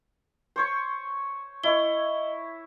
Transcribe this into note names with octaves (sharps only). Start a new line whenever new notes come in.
C5 C#5 C#6
E4 C#5 D#5 G7